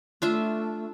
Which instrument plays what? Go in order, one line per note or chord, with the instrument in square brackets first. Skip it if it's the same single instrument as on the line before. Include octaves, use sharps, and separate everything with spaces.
[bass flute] A3 [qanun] D4 F4 E5